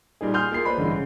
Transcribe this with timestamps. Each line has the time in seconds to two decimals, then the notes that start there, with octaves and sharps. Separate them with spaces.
0.21 A#2 G3 D#4 G#4
0.34 G#5 C6 D#6 F6 G6
0.52 A#3 F4 G#4 C7
0.65 B4 C5 D5 B5 C6
0.77 A1 G2 D3 E3 G#3
0.90 C#3